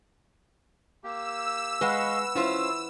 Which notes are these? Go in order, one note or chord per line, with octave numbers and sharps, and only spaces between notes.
A#3 G4 E6
G#3 B4 D#5 F5 F#5 C#6
E3 C#4 E4 F4 C5